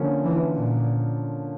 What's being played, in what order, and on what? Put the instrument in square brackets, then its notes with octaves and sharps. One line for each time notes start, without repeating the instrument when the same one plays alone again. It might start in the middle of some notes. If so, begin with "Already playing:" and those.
Already playing: [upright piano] D3 F3 A#3 C#4 F4
[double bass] E3
A#2